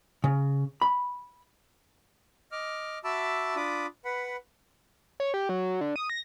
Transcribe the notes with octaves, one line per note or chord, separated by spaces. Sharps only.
C#3
B5
D#5 D6 F6
F#4 E5 A5 B5 D6 E6
D4 F4 B5 D6 D#6
B4 F#5 B5
C#5
G4
F#3
D3
D#6
A#6